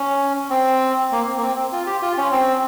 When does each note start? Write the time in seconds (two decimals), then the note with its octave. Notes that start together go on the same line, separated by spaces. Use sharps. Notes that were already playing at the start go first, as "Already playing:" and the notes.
Already playing: C#4
0.50 C4
1.12 A#3
1.27 C4
1.37 A#3
1.42 C4
1.56 C4
1.72 F4
1.86 G4
2.02 F4
2.17 C#4
2.32 C4